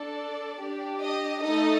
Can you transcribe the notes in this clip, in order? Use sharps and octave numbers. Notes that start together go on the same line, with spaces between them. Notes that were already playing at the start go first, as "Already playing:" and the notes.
Already playing: D4 A4 D5
D4 G4
D#5
A3 D#4 A4 D#5